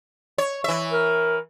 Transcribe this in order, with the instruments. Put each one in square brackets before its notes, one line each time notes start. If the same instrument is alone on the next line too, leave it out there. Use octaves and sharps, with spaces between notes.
[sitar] C#5
E3 E5
[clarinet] A#4